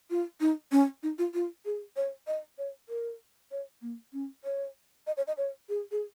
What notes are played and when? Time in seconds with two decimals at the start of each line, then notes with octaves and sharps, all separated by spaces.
0.10 F4
0.40 D#4
0.72 C#4
1.03 D#4
1.18 F4
1.34 F4
1.65 G#4
1.96 C#5
2.27 D#5
2.58 C#5
2.89 A#4
3.52 C#5
3.82 A#3
4.13 C#4
4.44 C#5
5.07 D#5
5.17 C#5
5.27 D#5
5.38 C#5
5.69 G#4
5.92 G#4